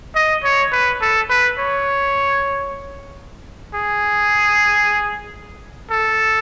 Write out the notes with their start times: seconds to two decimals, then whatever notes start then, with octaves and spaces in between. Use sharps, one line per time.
0.15 D#5
0.44 C#5
0.72 B4
1.01 A4
1.30 B4
1.59 C#5
3.74 G#4
5.90 A4